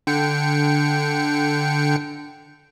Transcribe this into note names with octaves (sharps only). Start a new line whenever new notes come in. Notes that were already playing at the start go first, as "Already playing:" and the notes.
D3 G5 C#7